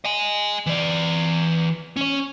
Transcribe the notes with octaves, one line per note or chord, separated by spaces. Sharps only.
D#5 G#5
E3 D5
C#4 C#5